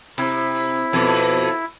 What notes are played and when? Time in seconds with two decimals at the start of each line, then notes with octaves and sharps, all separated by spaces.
0.18 C3 E4
0.93 F2 B2